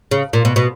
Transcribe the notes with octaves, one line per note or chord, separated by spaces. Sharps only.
C#3
A#2
B2
B2